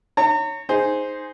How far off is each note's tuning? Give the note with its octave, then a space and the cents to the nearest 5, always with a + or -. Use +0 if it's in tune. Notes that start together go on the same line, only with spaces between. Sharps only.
C#5 +0 A#5 -35
D#4 +0 G#4 +0 C5 +0